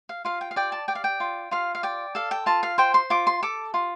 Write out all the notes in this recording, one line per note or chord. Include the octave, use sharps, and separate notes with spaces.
F5
F4 F5
G5
F5
D5 G5
A5
D5 G5
F5
G5
F4
F4 F5
F5
D5 G5
A4 F5
G5
F4 A5
F5
C5 G5
C6
F4 D6
C6
A4 D6
F4